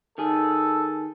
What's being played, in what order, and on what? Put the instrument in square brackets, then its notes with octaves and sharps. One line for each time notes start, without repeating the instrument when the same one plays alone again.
[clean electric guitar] D#3 G#4 [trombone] A4